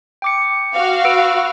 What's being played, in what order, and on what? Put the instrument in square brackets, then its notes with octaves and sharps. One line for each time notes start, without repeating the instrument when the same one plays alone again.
[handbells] G5 D6 C#7
[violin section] F#4 F5
[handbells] B4 E6 D7